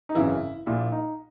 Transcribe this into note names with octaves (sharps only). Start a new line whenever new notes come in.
D#4
G#1 F#2 C#3 E3 E4
A#1 A#2 E4
D#4